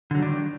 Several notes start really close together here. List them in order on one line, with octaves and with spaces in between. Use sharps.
D3 F#3 G3 D4 D#3